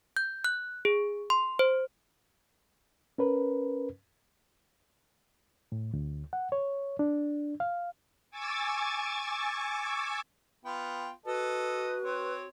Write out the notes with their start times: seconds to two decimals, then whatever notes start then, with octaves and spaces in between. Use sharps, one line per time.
0.17 G6
0.44 F#6
0.85 G#4
1.30 C6
1.59 C5
3.18 C#4 A#4 B4
5.72 A2
5.93 D2
6.33 F#5
6.52 C#5
6.99 D4
7.60 F5
8.31 G#5 C#6 D6 E6 G#6 A6
10.65 B3 F4 G5
11.26 F#4 A4 B4 D#5
12.03 C4 C#5